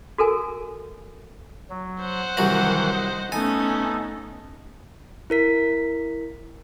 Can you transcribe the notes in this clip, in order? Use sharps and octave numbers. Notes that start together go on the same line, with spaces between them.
F#4 A4 A#4 G#5
F#3
C5 F#5
C2 D#3 E3 F#3 F#4
D#5
A3 B3 C#4 D#4 A4 G#5
E4 A#4 B6